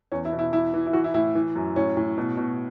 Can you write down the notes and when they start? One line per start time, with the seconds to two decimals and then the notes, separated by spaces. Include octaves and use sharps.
0.12 E2 C#4
0.25 E4
0.33 B2
0.39 E4
0.52 E3 E4
0.74 E3
0.87 E4
0.93 E3 F#4
1.04 E4
1.14 A2 E4
1.35 E3
1.56 F#2
1.76 A2 C#4
1.97 A2
2.17 B2
2.37 B2